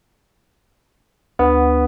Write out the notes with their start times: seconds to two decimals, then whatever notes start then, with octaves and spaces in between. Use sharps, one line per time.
1.39 D2 B3